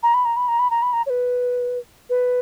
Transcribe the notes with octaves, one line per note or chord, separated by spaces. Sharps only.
A#5
B5
A#5
B5
A#5
B5
A#5
B5
A#5
C#5
B4
B4